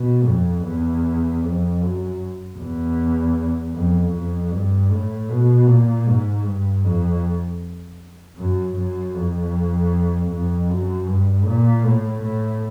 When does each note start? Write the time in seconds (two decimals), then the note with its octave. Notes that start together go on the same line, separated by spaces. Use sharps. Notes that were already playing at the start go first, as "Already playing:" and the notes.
Already playing: B2
0.27 F2
0.65 E2
1.44 F2
1.82 F#2
2.59 E2
3.74 F2
4.13 F2
4.51 G2
4.90 A2
5.29 B2
5.67 A#2
6.06 G#2
6.44 G2
6.84 F2
8.37 F#2
8.75 F#2
9.14 F2
10.31 F2
10.69 F#2
11.07 G2
11.47 A#2
11.84 A2
12.23 A2